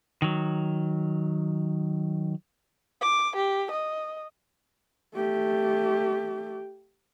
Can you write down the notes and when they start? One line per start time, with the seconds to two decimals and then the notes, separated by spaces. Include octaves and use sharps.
0.22 D#3 F#3
3.02 D6
3.36 G4
3.71 D#5
5.15 A3 G4